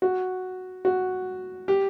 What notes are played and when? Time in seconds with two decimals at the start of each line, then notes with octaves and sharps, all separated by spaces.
0.02 F#4
0.85 F#4
1.68 G4